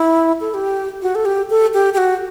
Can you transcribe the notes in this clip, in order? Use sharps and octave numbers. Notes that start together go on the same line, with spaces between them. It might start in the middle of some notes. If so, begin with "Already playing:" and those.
Already playing: E4
A4
G4
F#4
A4
G4
A4
G4
G4
F#4